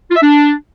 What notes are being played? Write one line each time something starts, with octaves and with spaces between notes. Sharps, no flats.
F4
E5
D4